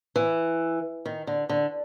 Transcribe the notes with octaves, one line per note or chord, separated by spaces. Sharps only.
E3
D#3
D3
D3